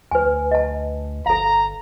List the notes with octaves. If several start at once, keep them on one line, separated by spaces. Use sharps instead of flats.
D2 B4 G#5
D#5 A5
G1 A4 F5 A#5